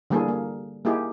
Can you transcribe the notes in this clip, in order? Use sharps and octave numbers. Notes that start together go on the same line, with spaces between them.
D3 E3 G3 A#3 G#4 A4
A#3
A#3 D#4 E4 G4 G#4